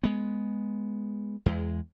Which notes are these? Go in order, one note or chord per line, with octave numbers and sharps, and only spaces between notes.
G#3 B3
E2 G#3